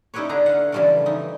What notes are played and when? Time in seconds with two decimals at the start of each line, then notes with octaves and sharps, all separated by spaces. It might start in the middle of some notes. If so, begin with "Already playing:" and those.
0.14 C#4 D#4 E4 G4 B4 C#5
0.29 D3 D4 G#4 B4 A#5
0.46 F5 F#5
0.72 C#3 E3 F3 G3 A3 A#4
1.06 E3 D#4